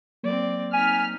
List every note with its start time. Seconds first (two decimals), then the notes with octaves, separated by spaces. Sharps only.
0.23 F#3 A#3 C4 D5
0.73 C4 D#4 G#5 F6 B6